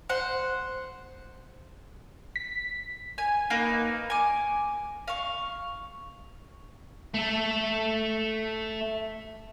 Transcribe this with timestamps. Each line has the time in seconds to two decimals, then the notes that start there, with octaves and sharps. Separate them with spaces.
0.09 C5 F#5
2.36 B6
3.18 G#5
3.50 A#3 D#4 B4
4.10 G#5 D6
5.08 F5 C#6
7.14 A3 A4